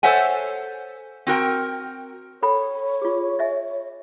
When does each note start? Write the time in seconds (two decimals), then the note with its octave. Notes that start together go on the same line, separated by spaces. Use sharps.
0.03 A4 C5 C#5 E5 F#5 G#5
1.27 C4 F#4 A#4 G5
2.43 A4 C#5 G5 B5
3.02 F4 G#4
3.39 D#5 E5 G#5